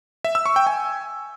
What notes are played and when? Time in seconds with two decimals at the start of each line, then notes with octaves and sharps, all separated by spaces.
0.24 E5
0.35 E6
0.46 C#6
0.56 G5
0.67 G#5